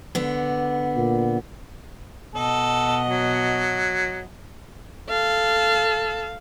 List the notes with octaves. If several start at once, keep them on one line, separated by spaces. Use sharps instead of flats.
D3 B3
A#2
B2 A4 D#5 F#5
F#3
A4 F5